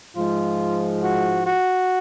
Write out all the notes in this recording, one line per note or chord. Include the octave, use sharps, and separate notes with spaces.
G#2 F3 G#3 F4
F#4
F#4